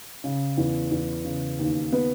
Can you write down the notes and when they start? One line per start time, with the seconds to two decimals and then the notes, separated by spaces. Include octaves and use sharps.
0.24 C#3
0.57 E2
0.92 E2
1.24 C#3
1.59 D#2
1.92 B3